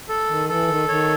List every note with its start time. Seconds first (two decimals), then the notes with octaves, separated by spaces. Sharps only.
0.09 A4
0.28 D#3
0.49 E3 A4
0.68 D#3
0.88 D#3 C#5